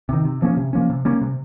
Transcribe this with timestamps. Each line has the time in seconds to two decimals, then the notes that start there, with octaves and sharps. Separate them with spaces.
0.09 C3 D#3
0.25 C3
0.42 F3 A#3 C#4
0.57 C3
0.73 F3 A#3 C#4
0.90 C3
1.05 G3 A#3 C#4
1.21 C3